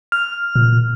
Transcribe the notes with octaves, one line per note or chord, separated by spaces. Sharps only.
F6
A#2